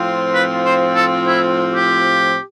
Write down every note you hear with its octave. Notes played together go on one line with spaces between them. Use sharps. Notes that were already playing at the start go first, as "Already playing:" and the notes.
Already playing: A2 F3 C4 F4
B4
C5
A4
E4
G4